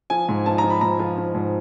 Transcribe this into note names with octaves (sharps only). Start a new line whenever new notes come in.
F3 G#5
G#2
F3 A5
A#5
F3
B5
G#2 A#5
F3
F3
G#2